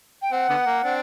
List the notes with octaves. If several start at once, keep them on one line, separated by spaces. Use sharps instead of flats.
G5
C4 F#5
D3 B3
A#3
C4 D4